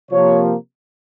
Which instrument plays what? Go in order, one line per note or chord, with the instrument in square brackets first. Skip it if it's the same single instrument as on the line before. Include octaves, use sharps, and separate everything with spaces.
[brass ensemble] C3 F3 A#3 C#5